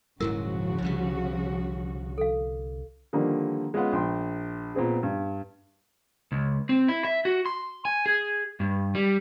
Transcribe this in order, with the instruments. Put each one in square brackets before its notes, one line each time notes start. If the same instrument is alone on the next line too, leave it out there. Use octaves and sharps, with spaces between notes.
[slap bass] D#1 G#2 F#3 [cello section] C#3 F3 F#4 [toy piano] E4 A#4
[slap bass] C2 D3 G3
[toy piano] A4 F5
[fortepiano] D3 D#3 F3 G3 A#3
G#3 B3 C#4 F4 B4 F#5
A#1 G5 C6
A#2 B3 C4 G#4
G2
[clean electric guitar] C#2
C4
E4
E5
F#4
C6
G#5
G#4
G2
G3